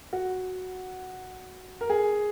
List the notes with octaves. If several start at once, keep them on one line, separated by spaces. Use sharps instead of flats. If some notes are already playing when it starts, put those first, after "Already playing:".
F#4
A#4
G#4